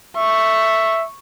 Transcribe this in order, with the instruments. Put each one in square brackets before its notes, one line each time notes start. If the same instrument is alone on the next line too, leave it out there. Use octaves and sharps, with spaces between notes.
[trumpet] E5 [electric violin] C#6